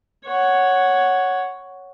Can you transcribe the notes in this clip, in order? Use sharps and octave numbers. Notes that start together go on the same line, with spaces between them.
C#5 F#5